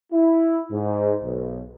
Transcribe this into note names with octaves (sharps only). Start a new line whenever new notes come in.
E4
G#2
B1